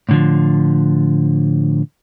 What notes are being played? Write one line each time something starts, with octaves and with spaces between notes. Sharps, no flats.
A2 D3 F3